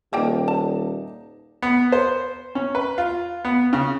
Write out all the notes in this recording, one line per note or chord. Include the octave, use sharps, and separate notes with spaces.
D#1 F3 A#3 D#4 D5 G5
A5
B3
C5
C#4
B4
F4
B3
C#3